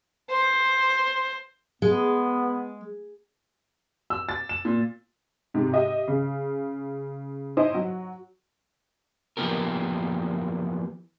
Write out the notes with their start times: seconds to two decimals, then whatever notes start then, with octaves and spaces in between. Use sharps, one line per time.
0.31 C5
1.82 G#3 B3
4.10 E6
4.29 A6
4.49 E7
4.65 A#2
5.54 G#2 C3 D#4
5.73 G4 D#5 E5
6.08 C#3
7.57 D#4 E4 C5 C#5 D#5
7.74 F#3 F#4
9.37 E3 F3 A#3 B3 G4 A#4